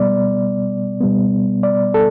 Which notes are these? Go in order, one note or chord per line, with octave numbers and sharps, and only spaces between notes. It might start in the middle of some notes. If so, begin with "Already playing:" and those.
Already playing: B2 G3 B3 D5
B2 G3 B3
D5
A4